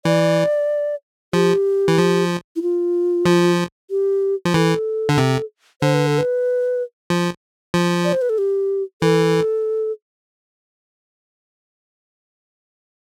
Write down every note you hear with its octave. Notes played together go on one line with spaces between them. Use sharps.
E3 D5
F3 G4
E3
F3
E4
F4
F3
G4
F3
E3 A4
D3
C3
D3 C5
B4
A4
B4
F3
F3
D5
C5
B4
A4
G4
E3 A4